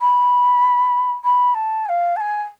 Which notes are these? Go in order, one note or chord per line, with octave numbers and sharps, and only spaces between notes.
B5
B5
A5
G#5
F5
A5
G#5